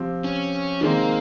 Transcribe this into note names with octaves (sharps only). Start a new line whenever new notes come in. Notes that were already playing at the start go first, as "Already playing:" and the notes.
Already playing: F3 C4 G4
C#4
D#3 G#3 A#3 C4